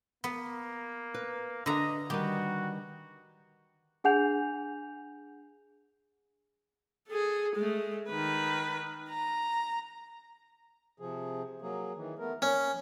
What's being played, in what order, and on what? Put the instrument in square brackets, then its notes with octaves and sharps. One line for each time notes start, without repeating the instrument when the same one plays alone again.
[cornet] A#3 [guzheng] B3
[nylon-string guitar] B4
[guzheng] D3 A#5 [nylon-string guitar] B4 E5 [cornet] D#5
[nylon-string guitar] D#3 G3 B4 [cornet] F#4 [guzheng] G4
[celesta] D4 G#4 F#5 G#5 G6 F7
[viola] G#4 A4
G#3 A3
D#3 B4
A#5
[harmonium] C3 F3 G#4
F#3 A#3 G#4
D#3 E3
A3 B3 A#4
[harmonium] A#3 [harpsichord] C#4